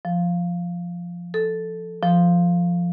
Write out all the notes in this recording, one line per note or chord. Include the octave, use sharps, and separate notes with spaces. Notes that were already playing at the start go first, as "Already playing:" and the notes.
F3
A4
F3